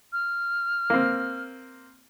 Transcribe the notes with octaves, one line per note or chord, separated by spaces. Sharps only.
F6
A#3 C4